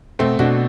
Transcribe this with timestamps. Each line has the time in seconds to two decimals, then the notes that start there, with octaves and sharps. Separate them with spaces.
0.19 B2 A3 C4
0.39 B2 D4 F#4